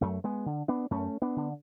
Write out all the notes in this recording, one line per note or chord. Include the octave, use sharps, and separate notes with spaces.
F#2 F#3 A3
G#3 B3
D3
B3 D4
F#2 A3 C#4
B3 D4
D3